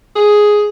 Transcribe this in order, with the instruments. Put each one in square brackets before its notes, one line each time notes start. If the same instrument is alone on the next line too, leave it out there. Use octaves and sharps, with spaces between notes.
[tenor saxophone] G#4